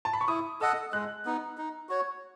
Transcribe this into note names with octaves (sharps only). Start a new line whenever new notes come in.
A5
B5
C#6
E4 D#6
A4 D#5 F#5 E6
G#3 F#6
B3 D#4
D#4
F#4 C#5